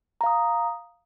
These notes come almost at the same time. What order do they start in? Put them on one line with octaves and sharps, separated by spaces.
A#5 F5 D#6